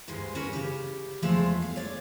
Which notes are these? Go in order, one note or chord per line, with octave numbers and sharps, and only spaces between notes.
D2 G2 G#3 C5
C#4 F#4 G4 A#4 B4
C#3 G4
E2 G2 F3 G#3 A3
F5
C#5 D5